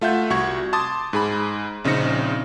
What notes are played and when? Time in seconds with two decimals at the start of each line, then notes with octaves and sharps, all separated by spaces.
0.01 A3 F4 E5 F#5 G6
0.30 C2 F#4 C#6 G#6
0.73 A5 C6 D6 D#6 A6
1.13 G#2 G#4 B5
1.84 A#1 C#3 C4 D#4 A#6 C#7